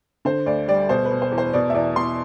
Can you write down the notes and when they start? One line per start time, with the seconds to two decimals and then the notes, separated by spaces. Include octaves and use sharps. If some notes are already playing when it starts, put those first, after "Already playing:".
0.25 D3 C5
0.46 D2 D5
0.68 G3 D5
0.89 B2 C5
1.05 B4
1.11 B2
1.22 C5
1.31 E2
1.38 C5
1.53 B2 D5
1.70 E5
1.74 E2 D5
1.96 E2 C6